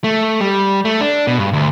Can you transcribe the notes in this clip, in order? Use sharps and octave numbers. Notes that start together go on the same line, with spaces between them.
A3
G3
A3
D4
B2
G2
D2